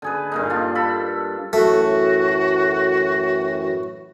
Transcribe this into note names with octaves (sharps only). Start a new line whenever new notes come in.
D3 G#4 B4
G2 A#2 D#4
D4 F4
A4 B5
F#2 A2 E3 A3 F#4